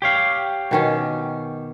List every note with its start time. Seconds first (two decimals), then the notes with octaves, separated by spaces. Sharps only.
0.02 G4 C#5 F5
0.71 B2 D#3 C#4